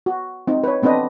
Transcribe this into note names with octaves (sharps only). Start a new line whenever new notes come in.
F#4
C4 D#4
B4 C#5
B3 C4 D4 B4 D#5